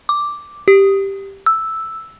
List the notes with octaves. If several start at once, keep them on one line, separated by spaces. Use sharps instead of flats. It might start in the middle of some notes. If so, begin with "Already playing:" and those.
D6
G4
E6